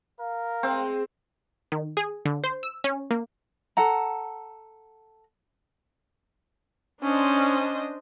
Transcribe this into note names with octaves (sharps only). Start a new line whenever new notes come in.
A#4 F5
G#3 C4
D#3
G#4
D3
C5
E6
C#4
A#3
A4 F#5 A#5
C#4 D4 C5 D#5